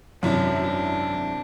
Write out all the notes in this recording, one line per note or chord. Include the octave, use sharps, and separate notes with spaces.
G#1 F#2 C3 D4 E4